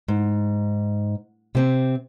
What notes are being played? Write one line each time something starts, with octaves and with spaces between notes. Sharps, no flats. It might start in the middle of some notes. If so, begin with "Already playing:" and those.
G#2
C3 C4